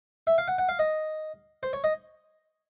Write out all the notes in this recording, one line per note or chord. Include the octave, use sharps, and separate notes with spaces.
E5
F5
F#5
F#5
F5
D#5
C5
C#5
D#5